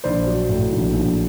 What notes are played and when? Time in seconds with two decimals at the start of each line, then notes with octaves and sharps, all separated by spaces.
0.04 A#1 C5 D5
0.26 F#3
0.49 A2
0.72 A#1
0.94 A#1